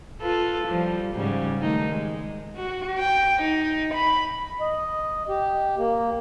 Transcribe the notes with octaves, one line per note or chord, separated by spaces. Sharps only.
F4 A4 B4
F3 G3
G#2 C#3 G3
D#3 A3 D#4
G#3
F#4
G5
D#4
B5
D#5
G4
A#3